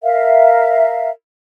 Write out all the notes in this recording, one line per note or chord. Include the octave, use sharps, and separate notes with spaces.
A#4 E5 F5